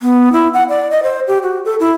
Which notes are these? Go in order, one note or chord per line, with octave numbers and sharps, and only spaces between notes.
B3
E4
F#5
D5
D#5
C5
G4
F#4
A4
E4